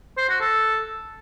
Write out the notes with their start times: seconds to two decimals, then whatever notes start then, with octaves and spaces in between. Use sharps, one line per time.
0.18 C5
0.29 F#4
0.41 A4